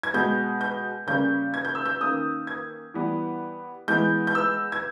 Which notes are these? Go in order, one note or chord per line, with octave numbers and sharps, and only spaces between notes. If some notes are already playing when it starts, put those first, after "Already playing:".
G#6
B2 G#3 B3 G6
G6
C#3 G3 A#3 C#4 G6
G#6
G6
E6
G6
D#3 A#3 C#4 D#6
G#6
E3 G3 B3
E3 G#3 B3 G6
G6
E6
G#6